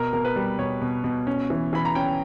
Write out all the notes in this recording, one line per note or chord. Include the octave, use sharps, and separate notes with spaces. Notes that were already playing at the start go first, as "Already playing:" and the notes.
Already playing: B2 A#4
B2 A#4
B4
G3
B2 C#5
B2
B2
C#4
E3
E3 B5
A#5
C#4 G5